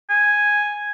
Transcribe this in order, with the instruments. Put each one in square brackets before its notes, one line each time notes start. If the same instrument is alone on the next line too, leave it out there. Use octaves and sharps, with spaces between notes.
[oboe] G#5